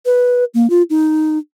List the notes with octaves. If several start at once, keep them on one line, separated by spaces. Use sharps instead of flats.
B4
A#3
F4
D#4